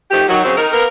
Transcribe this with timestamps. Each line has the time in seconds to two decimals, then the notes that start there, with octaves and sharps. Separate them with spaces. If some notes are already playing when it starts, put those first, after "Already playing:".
0.11 D#3 F3 A3 G4
0.28 D#3 F#3
0.43 C#3 F#3 C4
0.57 D#3 A#4
0.72 A#3 B3 A#4